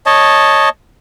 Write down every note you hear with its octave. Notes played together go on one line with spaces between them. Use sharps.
C#5 D#5 A5